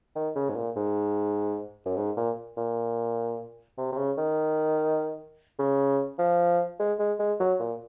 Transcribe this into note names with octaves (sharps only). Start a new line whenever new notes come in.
D#3
C#3
G#2
A#2
G#2
F#2
G#2
A#2
A#2
C3
C3
C#3
D#3
C#3
F3
G#3
G#3
G#3
F#3
A#2